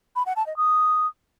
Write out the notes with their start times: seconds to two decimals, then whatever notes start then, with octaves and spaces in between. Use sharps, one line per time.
0.16 B5
0.26 F#5
0.36 A5
0.47 D#5
0.57 D#6